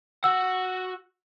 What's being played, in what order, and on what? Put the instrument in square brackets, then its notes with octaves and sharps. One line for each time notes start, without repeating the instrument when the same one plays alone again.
[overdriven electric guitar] F#4 F#5 [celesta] E6